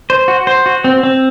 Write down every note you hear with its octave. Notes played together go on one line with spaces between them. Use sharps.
C5
F#4
C5
F#4
C4
C4